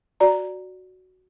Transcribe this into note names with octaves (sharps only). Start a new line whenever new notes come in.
F#4 D5 A#5